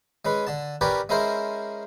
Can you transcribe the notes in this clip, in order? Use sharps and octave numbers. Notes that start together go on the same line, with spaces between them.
G#3 C#4 B4
D3 A5
C#4 G4 A#4 B4 C#5 D5
G#3 C#4 E4 A#4 C5